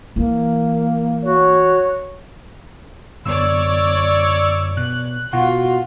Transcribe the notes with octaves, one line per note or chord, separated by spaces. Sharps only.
E3 A#3
F#4 C#5
F#2 D3 B3 C#5 D5 E6
B2 F#6
B2 F4 F#4